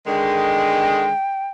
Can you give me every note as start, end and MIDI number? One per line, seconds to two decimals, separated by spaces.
0.07 1.11 50
0.07 1.11 51
0.07 1.11 56
0.07 1.49 79